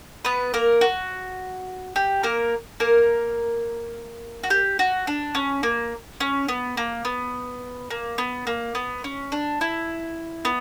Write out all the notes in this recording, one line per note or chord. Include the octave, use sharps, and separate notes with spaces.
B3 B4
A#3 A#4
F#4
G4
A#3 A#4
A#3 A#4
F#4
G4
F#4
D4
C#4
A#3
C#4
B3
A#3
B3
A#3
B3
A#3
B3
C#4
D4
E4
B3